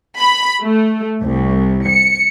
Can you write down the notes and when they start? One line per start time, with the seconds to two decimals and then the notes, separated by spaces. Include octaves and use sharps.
0.18 B5
0.62 A3
1.21 C2
1.87 C#7